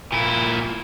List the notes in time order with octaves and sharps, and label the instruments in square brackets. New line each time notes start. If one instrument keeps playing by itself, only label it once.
[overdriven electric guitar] A#2 E4